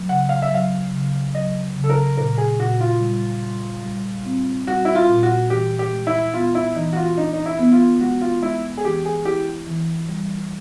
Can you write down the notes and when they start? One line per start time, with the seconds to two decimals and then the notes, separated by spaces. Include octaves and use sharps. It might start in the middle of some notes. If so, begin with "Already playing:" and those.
Already playing: F#3
0.09 C#3 F#5
0.29 F5
0.42 E5
0.51 F#3 F5
0.92 C#3
1.35 F#3 D#5
1.76 C#3
1.84 A4
1.90 A#4
2.17 A#2 A#4
2.38 G#4
2.59 A#2 F#4
2.80 F4
3.00 G3
3.43 G3
3.85 G3
4.26 C4
4.67 G3 F#4
4.85 E4
4.95 F4
5.09 A#2
5.23 F#4
5.50 E3 G4
5.79 G4
5.93 G#3
6.07 E4
6.34 B3 F4
6.55 E4
6.76 E3 D#4
6.93 F#4
6.96 F4
7.17 D4 D#4
7.33 D#4
7.46 E4
7.59 B3
7.72 F4
8.00 G#3 F#4
8.21 F4
8.42 G#3 E4
8.77 G#4
8.85 E3 G4
9.05 G#4
9.25 E4 G4
9.67 E3
10.09 G3